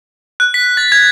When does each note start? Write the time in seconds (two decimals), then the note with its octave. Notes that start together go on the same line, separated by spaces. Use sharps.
0.40 F#6
0.54 B6
0.77 A6
0.92 G#6